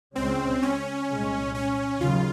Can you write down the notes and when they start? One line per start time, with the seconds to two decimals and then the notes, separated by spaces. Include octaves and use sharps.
0.16 C#2 C#3 G#3 C4 C#4
0.62 C#4
1.09 C2 A#2 G#3
1.55 C#4
2.01 D#2 C#3 F#3 F4